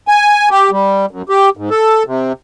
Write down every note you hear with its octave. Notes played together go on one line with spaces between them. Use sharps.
G#5
G4
G3
F#2
G4
G#2
A4
C3